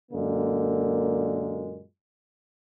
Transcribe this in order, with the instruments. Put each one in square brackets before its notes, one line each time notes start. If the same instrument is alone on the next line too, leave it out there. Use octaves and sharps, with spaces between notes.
[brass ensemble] F#2 A#2 D3 G#3 A#3